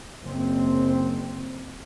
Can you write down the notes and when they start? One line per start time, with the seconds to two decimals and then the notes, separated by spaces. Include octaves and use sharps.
0.23 F#1 C4